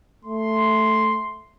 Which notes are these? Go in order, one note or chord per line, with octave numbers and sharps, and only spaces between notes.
A3 C6